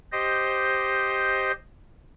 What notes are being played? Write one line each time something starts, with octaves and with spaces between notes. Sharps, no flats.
G4 C5 D#5